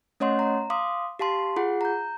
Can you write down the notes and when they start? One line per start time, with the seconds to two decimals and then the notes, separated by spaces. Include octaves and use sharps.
0.20 A3 C#4 C#5 D#5 F#5 C6
0.39 A#5
0.70 F5 C6 D6 D#6
1.19 G4 F5 A5 C6
1.56 F4 G#4 F#5
1.81 A#5 G6